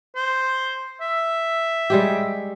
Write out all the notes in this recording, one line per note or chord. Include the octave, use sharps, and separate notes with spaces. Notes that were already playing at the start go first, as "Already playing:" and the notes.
C5
E5
G3 G#3 G4